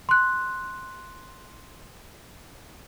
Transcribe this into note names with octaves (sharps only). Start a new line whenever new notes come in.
C6 F#6